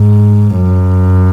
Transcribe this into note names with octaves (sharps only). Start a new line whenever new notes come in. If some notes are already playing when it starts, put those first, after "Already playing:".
Already playing: G#2
F#2